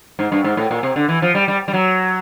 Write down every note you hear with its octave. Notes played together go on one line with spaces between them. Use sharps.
G#2
G2
G#2
A2
A#2
C3
D3
E3
F3
G3
G3
G3
F#3